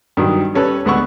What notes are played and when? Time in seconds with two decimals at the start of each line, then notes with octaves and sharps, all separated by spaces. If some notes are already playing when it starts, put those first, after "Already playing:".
0.17 G2 D#3 F#3
0.55 G3 C#4 A4 B4 C#5
0.85 D2 G#3 B3 F#5 C#6 E6